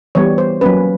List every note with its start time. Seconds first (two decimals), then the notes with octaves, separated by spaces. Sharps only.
0.15 E3 G3 B3 C#5
0.38 C5
0.61 F#3 A#3 C#4 B4